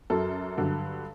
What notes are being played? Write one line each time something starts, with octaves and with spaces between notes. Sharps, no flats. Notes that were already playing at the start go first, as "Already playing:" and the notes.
F#2 F#3 A4
G2 D3 F#3